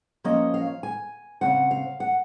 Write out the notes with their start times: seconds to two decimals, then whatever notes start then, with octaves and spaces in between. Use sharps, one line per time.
0.24 F3 A#3 C#4 D#5
0.54 F5
0.83 G#5
1.41 C#3 F3 C4 F#5
1.71 F5
2.00 F#5